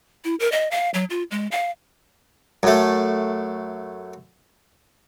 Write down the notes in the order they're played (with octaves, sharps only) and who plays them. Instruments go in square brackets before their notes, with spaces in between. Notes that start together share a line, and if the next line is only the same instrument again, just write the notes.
[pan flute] E4
A#4
D#5
F5
F#3
F4
G#3
F5
[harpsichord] F#2 A3